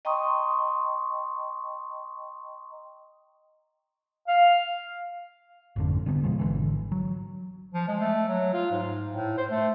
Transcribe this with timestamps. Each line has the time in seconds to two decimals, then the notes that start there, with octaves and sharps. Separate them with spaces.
0.05 D#5 G5 A#5 C6 C#6 D#6
4.28 F5
5.76 G#1 F2 D3
6.06 D3 G3 B3
6.23 B2 F3 G#3
6.39 G#1 D3 E3
6.92 F#3
7.74 F3
7.88 G#3
8.01 A3
8.29 F#3
8.54 F4
8.71 G#2
9.11 A2
9.38 C5
9.51 A3